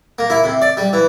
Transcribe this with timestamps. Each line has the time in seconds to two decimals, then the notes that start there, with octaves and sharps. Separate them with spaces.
0.19 A#3
0.30 E4
0.44 C3
0.62 D5
0.77 G3
0.93 E3